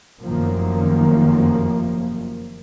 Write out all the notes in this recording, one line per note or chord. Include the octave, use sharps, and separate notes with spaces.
F1 F#2 D#3 F3 A#3